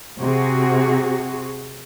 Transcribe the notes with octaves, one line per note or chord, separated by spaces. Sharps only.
C3 F#4 G#4